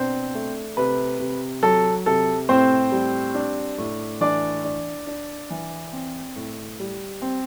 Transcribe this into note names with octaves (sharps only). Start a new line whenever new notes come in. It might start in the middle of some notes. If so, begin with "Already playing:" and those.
Already playing: B2 C4 D4 C5
A3
C3 B4
C3
F#3 A4
C3 A4
A2 C4 C5
G3
D4
A2
E3 D4 D5
D4
D4
E3
C4
A2
G3
C4